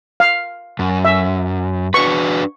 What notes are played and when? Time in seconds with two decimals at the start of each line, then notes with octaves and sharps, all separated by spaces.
0.20 F5
0.79 F#2
1.05 E5
1.94 D4 F#4 B4 C#6